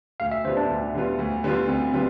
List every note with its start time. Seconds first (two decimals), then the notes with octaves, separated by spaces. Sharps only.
0.20 D2 F5
0.32 E5
0.44 D3 G3 B3 F4 C5
0.57 D4
0.69 D2
0.94 D3 G3 B3 F4
1.19 D2
1.44 D3 G3 B3 F4
1.68 D2 C4
1.93 D3 G3 B3 C4 F4